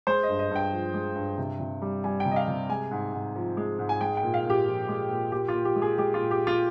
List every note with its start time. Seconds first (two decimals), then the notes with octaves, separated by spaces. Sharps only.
0.07 G#3 C5
0.23 D#5
0.29 G2
0.39 D#5
0.51 G2 G5
0.72 F3
0.94 G#3
1.16 G2
1.38 C3
1.60 C3
1.82 G3
2.04 G3 G#5
2.20 G5
2.25 C3
2.31 D#5
2.36 F5
2.48 C3
2.69 G#3 G#5
2.91 G#2
3.13 G#2
3.35 F3
3.57 G#3
3.79 G#2
3.89 G#5
4.01 G#3 G5
4.17 G5
4.23 A#2
4.34 F5
4.45 A#2 G4
4.66 F3
4.89 G#3
5.10 A#2
5.32 A#2 G4
5.48 F4
5.54 A#2
5.65 G4
5.76 G#3
5.82 G#4
5.98 G#3 G4
6.14 F4
6.20 A#2
6.31 G4
6.42 A#2 F4